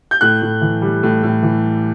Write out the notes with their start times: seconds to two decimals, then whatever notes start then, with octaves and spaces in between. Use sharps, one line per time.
0.11 G6
0.21 A2 F#6
0.42 A2
0.61 E3
0.82 G3
1.03 A2
1.23 A2
1.43 E3